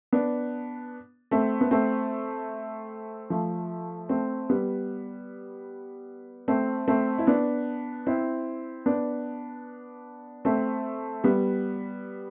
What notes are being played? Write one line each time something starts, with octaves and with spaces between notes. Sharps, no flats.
B3 D4
A3 C4
B3
A3 C4
F3 A3
A3 C4
G3 B3
A3 C4
A3 C4
E4
B3 D4
C4 E4
B3 D4
A3 C4
G3 B3